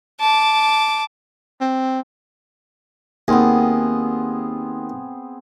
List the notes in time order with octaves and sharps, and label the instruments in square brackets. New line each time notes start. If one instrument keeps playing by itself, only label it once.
[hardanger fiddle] A5 D6
[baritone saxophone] C4
[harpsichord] D#2 [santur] B3 C4 G#4